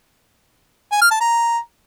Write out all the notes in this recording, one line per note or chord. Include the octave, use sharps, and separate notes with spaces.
G#5
F6
A5
A#5